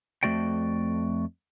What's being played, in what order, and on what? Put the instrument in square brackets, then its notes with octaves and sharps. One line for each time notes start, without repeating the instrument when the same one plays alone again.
[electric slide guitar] F2 G#2 A3 F#4 D5 G5